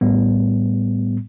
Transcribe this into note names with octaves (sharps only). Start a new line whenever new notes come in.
A2 G3 B3